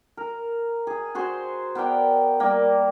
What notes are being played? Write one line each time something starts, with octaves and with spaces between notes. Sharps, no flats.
A#4
G#4
F#4 G#4 C5 C6
B3 A#4 D5 G5
G3 A#3